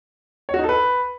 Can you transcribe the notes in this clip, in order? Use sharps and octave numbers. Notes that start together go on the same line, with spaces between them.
C#5
F#4
D#4
A4
B4